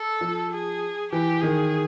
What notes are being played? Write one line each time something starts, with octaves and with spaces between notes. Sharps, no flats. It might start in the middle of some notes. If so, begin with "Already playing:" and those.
Already playing: A4
F3
G#4
E3 G4
D#3 G#4